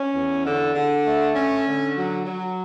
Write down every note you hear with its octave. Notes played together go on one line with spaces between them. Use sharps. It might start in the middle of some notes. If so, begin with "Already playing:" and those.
Already playing: C#4
E2
D3
D3
A3
C#4
D3
F#3
F#3